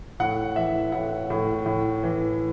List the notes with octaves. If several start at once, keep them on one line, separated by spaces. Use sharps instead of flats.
A2 F#5
E3 E5
A2 F#5
A2
A2
E3